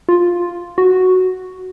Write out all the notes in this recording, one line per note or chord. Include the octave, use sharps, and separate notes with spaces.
F4
F#4